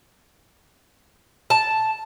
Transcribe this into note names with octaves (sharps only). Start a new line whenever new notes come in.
A5